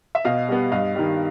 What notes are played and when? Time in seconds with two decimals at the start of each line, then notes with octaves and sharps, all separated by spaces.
0.15 E5
0.25 B2 D#5 F5
0.49 G3 B3
0.72 G2 D#5 F5
0.95 D#3 G3